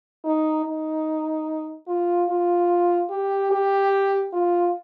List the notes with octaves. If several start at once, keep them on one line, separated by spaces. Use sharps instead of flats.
D#4
D#4
F4
F4
G4
G4
F4